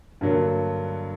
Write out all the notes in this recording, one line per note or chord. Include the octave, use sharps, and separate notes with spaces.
G2 D3 F#3 A#3